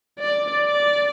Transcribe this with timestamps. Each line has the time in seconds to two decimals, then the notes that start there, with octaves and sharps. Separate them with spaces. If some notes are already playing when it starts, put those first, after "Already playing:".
0.19 D5
0.65 D5